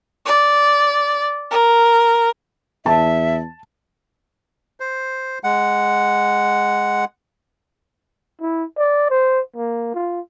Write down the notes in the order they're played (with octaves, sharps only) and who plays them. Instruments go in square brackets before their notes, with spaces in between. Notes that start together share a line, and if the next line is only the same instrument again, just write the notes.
[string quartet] D5
A#4
[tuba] E2 [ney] E5 [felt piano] A5
[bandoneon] C5
G#3 F#5
[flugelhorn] E4
D5
C5
A#3
F4